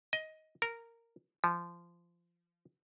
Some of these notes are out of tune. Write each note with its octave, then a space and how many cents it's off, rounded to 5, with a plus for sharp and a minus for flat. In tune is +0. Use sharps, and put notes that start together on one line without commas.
D#5 +15
A#4 -10
F3 -20